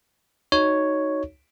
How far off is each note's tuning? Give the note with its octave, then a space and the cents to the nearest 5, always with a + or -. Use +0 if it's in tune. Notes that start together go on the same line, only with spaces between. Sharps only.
D#4 +0 F#4 +0 C#5 +0